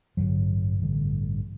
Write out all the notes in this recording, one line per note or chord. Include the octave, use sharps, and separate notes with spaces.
A1 G2 D3 F#3
A1 G2 D3